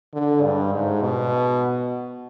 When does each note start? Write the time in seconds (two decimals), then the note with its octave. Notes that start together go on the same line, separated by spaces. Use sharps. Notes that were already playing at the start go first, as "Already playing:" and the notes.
0.14 D3
0.43 G2
0.72 G#2
1.02 B2